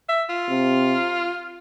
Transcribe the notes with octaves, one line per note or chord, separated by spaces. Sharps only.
E5
F4
C3